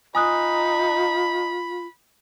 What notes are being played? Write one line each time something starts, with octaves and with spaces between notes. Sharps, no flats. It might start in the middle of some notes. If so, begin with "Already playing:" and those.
D#4 F4 G#5 B5 D#6 F#6